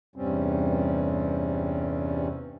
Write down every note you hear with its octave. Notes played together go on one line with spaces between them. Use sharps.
E2 G2 C3 G3 C4 C#4